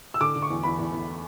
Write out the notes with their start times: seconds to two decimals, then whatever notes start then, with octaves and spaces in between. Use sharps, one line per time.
0.14 E6
0.21 D3 D6
0.36 D3
0.42 C#6
0.50 E2
0.63 E2 B5
0.78 E2
0.93 E2